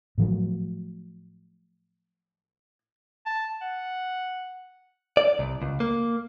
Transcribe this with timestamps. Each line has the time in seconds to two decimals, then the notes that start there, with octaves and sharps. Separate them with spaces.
0.18 A2 F3 F#3
3.26 A5
3.62 F#5
5.17 D5
5.39 C2
5.62 C#2
5.80 A#3